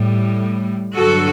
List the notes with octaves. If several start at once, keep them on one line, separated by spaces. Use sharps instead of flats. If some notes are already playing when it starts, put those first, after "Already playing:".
Already playing: A2 G3
G2 D3 F#3 F#4 A4